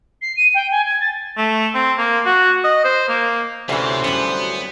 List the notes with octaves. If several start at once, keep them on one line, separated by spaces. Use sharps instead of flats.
C7
D#7
G5
G#5
G#6
A6
A3
C4
A#3
F#4
D#5
C5
A#3
D2 C3 E3 C#4 D4 G4 C5 C#5
F#2 G3 B3